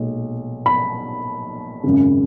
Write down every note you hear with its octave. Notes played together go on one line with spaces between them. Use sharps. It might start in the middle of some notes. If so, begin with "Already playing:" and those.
Already playing: B1 A#2 G#3
B5
G#1 F#2 C#3